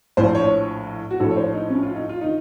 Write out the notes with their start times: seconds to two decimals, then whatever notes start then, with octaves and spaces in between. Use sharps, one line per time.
0.17 A#1 A2 F3 C5
0.35 C#5
1.11 F#4
1.20 A#1 A2 F3 A4
1.31 C#5
1.37 C5
1.54 D#4
1.70 C#4
1.83 F4
1.96 D#4
2.09 F4
2.21 D#3 D#4